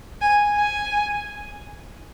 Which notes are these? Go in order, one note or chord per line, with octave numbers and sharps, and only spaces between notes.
G#5
G#5